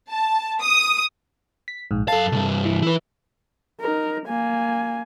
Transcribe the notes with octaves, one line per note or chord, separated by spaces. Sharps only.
A5
D#6
B6
A#1 G#2
F#2 A4 F5 A5
C2 G2
E3
E4 B4
D#4 A#4
A#3 G#5